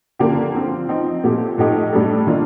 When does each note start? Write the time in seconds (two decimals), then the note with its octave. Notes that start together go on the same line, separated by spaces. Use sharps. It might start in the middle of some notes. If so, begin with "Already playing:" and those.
0.19 D3 F3 A#3 D4 G4
0.54 F3 C4 F4
0.88 F3 C4 D#4
1.24 A#2 A3 C4 G4
1.58 A2 F3 A3 D#4 G4
1.93 A2 G3 D4 A4
2.27 D#3 A#3 D4 F4